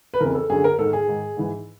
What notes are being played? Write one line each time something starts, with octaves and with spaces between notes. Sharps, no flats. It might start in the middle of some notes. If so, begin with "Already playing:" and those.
B4
F2 C#3 E3 A#4
A4
F#2 D3 G#4
A#4
G#2 D#3 A4
G#4
G#2 D#3
G#2 E3